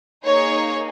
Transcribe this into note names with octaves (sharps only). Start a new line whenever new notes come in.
A#3 D#4 G#4 C#5